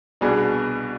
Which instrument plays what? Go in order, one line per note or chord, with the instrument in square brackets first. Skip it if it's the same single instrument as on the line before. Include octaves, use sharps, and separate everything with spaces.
[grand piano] C2 B2 B3 D4 G#4